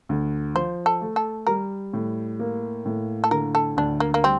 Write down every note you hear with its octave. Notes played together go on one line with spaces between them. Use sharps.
D2
F3 C5
A4
A3
A4
G3 A#4
A2
A#3
A2
A4
D3 A#4
A4
D2 D4
A#3
A#3
G3 C4